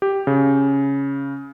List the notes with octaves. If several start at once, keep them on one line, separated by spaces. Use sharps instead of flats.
G4
C#3